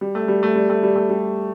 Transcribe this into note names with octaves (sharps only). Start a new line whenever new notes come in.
G3
A3
G3
A3
G3
A3
G3
A3
G3